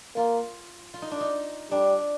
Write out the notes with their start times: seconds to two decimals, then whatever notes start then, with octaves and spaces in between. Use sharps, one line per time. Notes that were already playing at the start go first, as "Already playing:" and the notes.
0.16 A#3 F4
0.94 F4
1.02 D#4
1.11 D4
1.20 D#4
1.71 G3 D4